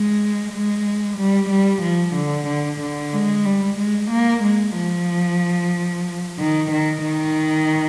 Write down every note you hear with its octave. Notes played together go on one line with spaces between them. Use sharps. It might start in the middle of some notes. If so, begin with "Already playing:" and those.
Already playing: G#3
G#3
G3
G3
F3
D3
D3
D3
G#3
G3
G#3
A#3
G#3
F3
D#3
D#3
D#3